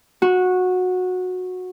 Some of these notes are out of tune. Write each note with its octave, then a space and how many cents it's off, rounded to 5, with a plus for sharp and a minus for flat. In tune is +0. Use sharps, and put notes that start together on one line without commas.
F#4 -15